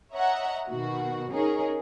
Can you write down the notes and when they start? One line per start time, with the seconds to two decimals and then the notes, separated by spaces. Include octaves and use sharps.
0.12 C#5 D#5 E5 F#5 A#5
0.68 B2 D#3 F#4
1.31 C#4 D#4 G#4 A#4